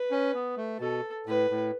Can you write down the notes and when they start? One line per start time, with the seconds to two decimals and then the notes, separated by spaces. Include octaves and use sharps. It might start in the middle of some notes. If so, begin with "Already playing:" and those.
Already playing: B4
0.11 C#4
0.34 B3
0.57 A3
0.80 B2 A4
1.26 A2 B4
1.50 A2